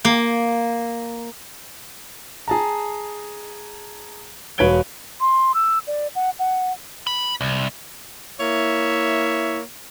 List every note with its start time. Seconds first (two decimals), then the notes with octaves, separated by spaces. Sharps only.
0.05 A#3
2.48 G#4 A5 A#5
4.58 E1 B4 C#5 G#6 D7 G7
5.20 C6
5.54 E6
5.87 D5
6.15 F#5
6.39 F#5
7.07 B5
7.41 C2
8.40 A#3 E4 C#5 E5